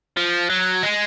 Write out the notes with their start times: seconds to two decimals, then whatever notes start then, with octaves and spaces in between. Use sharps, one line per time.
0.17 F3
0.50 F#3
0.83 G#3